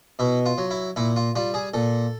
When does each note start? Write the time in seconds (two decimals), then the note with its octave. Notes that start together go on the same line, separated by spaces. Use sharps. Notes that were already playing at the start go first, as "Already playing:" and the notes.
0.19 B2 E4
0.46 F4
0.58 F#3
0.71 E4
0.96 A#2 E4
1.16 F4
1.36 G3 F4
1.54 G#4
1.74 A#2 A4